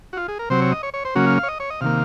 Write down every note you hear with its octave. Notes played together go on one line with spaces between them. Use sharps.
F#4
F4
G#4
A#4
C3 F#3 C4 C5
C#5
D#5
C#5
C#5
C5
C#3 F#3 A#3 C#4 F#4
F5
F5
C#5
D#5
C#5
D#5
C3 D#3 A#3 F5